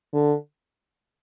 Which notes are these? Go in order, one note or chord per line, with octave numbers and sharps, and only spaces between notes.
D3